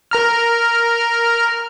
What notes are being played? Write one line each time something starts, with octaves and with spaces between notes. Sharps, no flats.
A#4 A#5 F6